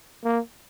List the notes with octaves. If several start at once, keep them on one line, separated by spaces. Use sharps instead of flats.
A#3